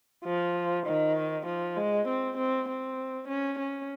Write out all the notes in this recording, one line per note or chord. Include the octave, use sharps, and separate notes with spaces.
F3
D#3
F3
G#3
C4
C4
C4
C#4
C#4